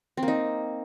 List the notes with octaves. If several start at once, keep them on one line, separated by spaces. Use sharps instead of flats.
C4
A#3
D#4